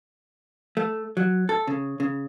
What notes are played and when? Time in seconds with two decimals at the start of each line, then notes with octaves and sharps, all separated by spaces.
0.77 A3
1.17 F#3
1.49 A4
1.67 C#3
2.00 C#3